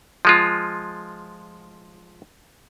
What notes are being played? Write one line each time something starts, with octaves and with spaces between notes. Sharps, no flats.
F3 G#3 F4